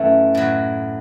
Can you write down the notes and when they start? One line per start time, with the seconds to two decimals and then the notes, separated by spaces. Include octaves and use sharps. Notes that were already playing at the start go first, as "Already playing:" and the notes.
Already playing: F#2 E3 A3
0.35 A2 F#3